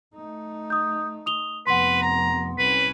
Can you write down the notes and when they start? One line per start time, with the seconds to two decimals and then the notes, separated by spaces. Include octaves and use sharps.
0.15 A3 D#4
0.70 D#6 G6
1.26 D#6 F7 G7
1.67 F1 B3 B4 F#5 C6
2.02 A#5
2.59 C2 C#4 B4